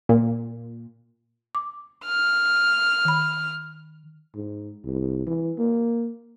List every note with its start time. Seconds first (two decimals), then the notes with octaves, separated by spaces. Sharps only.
0.09 A#2
1.55 D6
2.05 F6
3.05 D#3 B5
4.35 G#2
4.84 C2
5.27 E3
5.58 A#3